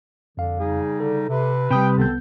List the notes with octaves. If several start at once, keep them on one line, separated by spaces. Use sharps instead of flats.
F2 D3 F5
C#3 G3 D#4 G#4
D3 A4
C3 B4
C3 G3 G5 B5 D#6 G6
C2 D3 D#3 B3 C4 A4 G6